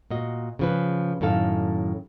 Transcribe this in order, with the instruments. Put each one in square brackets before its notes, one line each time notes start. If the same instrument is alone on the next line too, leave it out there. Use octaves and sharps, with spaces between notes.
[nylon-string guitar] A#2 F#4 D#5
C#3 F3 B4
F#2 A2 D#3 A4 F5